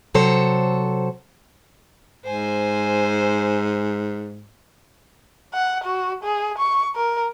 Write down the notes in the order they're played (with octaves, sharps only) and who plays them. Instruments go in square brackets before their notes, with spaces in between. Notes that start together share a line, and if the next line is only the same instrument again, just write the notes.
[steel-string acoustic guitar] C3 F#3 A4 C5 C#5
[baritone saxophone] G#2 [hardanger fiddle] C5 G#5
[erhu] F#5
F#4
G#4
C#6
A#4